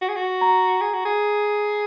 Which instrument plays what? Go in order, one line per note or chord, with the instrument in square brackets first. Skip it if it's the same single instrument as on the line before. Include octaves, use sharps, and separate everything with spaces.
[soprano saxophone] F#4
G#4
F#4
[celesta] A#5
[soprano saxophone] G#4
F#4
G#4